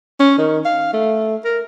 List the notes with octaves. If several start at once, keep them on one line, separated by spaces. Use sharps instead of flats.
C#4
D#3
F5
A3
A#4